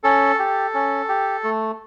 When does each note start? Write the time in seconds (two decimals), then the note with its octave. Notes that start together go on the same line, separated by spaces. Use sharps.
0.04 C#4 A4
0.39 G4
0.74 C#4
1.09 G4
1.44 A3